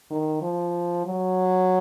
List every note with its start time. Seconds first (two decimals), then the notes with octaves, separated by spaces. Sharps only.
0.11 D#3
0.42 F3
1.06 F#3